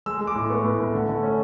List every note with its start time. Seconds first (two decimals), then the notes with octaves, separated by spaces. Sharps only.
0.06 G#3 E6
0.20 G#3
0.27 D6
0.35 A2
0.49 B3 C#6
0.64 A2
0.79 A2
0.94 D3
1.08 A3
1.23 C#4